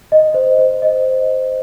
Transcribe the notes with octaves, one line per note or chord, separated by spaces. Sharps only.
D#5
C5
C5
D#5